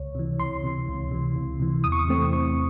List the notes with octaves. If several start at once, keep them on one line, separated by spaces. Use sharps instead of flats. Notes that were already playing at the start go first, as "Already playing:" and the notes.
Already playing: C#2 C#5
C3 E3
C#2 C6
C3 E3
C#2
C3 E3
C#2
C3 E3
E2 D#6
C#6
D#6
C3 E3 A3 C4
E2 C#6